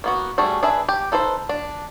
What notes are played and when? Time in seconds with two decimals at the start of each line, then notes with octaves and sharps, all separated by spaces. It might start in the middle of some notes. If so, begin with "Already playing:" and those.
0.04 A#3 B3 F#4
0.38 G3 A3 F#4 G#4
0.63 D4 G#4 B4 E5
0.89 G4
1.12 D#4 A4 B4 C5
1.49 D4